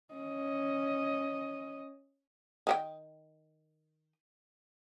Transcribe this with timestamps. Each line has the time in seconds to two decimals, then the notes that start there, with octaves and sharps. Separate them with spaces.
0.14 C#4 D#5
2.67 D#3 F#4 G5